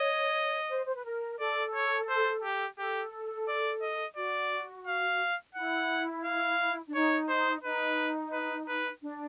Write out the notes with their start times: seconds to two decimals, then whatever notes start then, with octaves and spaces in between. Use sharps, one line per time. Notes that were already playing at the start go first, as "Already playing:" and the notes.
Already playing: C#5 D#5
0.70 C5
0.86 C5
0.95 B4
1.05 A#4
1.40 A4 D5
1.75 C#5
2.09 C5
2.44 G4
2.78 G4 A4
3.48 D5
3.82 D#5
4.17 F#4 D5
4.87 F5
5.55 E4 F#5
6.25 F5
6.87 D4
6.95 D#4 C#5
7.29 C5
7.64 D#4 B4
8.33 B4
8.68 B4
9.02 D4